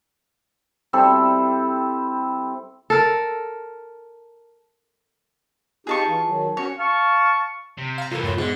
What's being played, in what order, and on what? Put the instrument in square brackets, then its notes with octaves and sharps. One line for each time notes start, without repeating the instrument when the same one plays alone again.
[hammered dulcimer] G3 C4 E4 A4
[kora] A4 A#4
[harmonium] D#4 F4 G4 [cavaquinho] G#4 A5 C#6
[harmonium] E3 F4
D#3 F#3
[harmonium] C#4 F#4 [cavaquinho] C#5
[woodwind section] F5 A5 C#6
[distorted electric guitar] C3
[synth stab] F5 A#5
[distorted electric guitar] C2 E3 [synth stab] F4 A#4 [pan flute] A4
[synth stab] F#2 A2 [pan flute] F4
[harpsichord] G#2 [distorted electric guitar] D3 [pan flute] B3